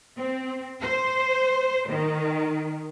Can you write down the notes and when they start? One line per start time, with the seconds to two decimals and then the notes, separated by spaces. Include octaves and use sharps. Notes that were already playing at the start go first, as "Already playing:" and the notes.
0.17 C4
0.81 C5
1.88 D#3